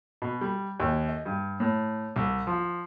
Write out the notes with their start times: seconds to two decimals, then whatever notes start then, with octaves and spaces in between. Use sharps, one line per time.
0.22 B2
0.41 G3
0.80 D#2
1.09 D#5
1.26 G2
1.60 A2
2.16 C2
2.47 F3